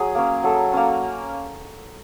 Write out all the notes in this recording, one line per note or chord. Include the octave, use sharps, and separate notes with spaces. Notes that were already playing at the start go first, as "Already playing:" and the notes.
Already playing: F#3 G#4
A#3 C#4
F#3 A4
A#3 C#4